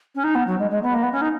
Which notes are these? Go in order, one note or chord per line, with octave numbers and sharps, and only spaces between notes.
C#4
D#4
B3
F#3
G#3
G#3
B3
A#3
B3
C#4
D#4